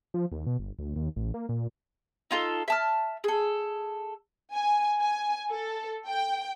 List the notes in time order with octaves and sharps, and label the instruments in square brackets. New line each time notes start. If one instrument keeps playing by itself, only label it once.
[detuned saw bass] F3
D#2
B2
G1
D2
D#2
A1
A#3
A#2
[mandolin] D#4 F4 A4
E5 A5 F6
G#4 A4
[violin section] G#5
G#5
A4
G5